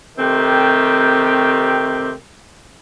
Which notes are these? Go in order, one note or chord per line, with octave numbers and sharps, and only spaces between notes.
C3 D#3 A3 C4 G4